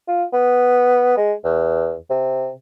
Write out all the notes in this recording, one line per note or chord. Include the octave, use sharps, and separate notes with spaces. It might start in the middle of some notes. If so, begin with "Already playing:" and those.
F4
B3
G#3
E2
C3